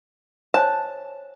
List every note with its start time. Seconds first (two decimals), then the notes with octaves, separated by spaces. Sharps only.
0.54 C5 C#5 G#5 A5